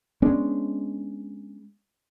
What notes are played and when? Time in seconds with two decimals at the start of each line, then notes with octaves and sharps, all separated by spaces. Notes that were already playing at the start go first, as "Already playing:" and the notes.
0.22 G#3 B3 C#4 D4